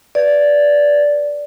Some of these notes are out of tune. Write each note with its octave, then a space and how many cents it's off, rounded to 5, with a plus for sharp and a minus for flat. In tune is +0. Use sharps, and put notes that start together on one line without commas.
B4 +0 D5 -10